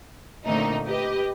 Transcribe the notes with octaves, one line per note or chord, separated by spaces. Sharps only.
A#2 D3 A3 A#3 C4 D#4
G4 B4 D#5